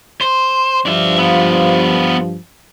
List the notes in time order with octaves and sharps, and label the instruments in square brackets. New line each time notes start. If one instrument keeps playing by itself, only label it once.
[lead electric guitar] C5
[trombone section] G2 F3 [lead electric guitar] D4 E5
[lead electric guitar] B3 F4